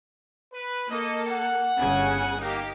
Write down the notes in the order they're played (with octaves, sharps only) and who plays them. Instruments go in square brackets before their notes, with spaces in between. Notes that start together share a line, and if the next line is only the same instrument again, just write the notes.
[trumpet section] B4
[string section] A#3 A4 [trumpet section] D#5
[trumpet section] F#5
[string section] G1 C#3 G#5
[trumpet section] A#3 [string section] D#4 G4